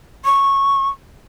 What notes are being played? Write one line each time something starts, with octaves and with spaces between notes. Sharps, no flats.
C#6